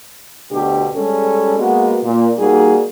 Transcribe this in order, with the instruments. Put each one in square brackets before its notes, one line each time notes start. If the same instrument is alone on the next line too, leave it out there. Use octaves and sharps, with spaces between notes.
[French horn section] D2 B2 D4 G4
G3 G#3 C#4 A4
G#3 A#3 B3 F#4
A#2
G3 A#3 D#4 F#4 G#4